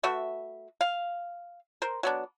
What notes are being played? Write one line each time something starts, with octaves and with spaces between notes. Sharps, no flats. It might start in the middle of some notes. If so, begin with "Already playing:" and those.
A3 F#4 B4 E5
F5
A#4 C5
F#3 B3 D4